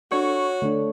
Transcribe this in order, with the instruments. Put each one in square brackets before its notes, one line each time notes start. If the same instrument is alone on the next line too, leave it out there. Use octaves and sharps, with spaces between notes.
[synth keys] D4 A4 C#6 [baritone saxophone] F#4 [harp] C#5
[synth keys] D3 [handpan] A3 D4